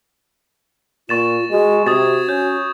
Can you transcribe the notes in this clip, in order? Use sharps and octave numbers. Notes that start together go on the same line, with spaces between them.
A#2 F4 C#6 A6 E7
G#3 F#4
C3 F#4 D#6 G#6 A6
C#4 G6